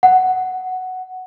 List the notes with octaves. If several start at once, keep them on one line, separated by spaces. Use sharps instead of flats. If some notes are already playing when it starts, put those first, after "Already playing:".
F#5